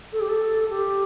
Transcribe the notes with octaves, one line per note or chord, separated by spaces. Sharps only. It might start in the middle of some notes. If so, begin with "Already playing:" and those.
A4
G4
A4
G4